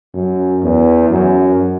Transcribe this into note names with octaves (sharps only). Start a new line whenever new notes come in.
F#2
E2
F#2